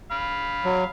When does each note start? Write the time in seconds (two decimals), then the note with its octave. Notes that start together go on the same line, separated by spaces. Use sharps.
0.11 F5 B5
0.65 F#3